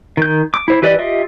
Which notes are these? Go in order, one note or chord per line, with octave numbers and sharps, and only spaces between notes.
D#3 G6
D6
E4 C5
E3 G4 B4 D5 D#5
F4 G4 D#5 E5